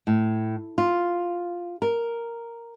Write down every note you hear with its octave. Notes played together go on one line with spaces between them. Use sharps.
A2
F4
A#4